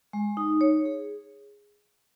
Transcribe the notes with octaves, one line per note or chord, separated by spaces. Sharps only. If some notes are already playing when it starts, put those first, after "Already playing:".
G#3
D#4
C#5
G#4